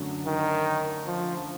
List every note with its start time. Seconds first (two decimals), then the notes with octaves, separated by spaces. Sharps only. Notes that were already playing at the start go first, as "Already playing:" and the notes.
Already playing: F#2 D3 F#3 A3
0.26 D#3
1.06 F3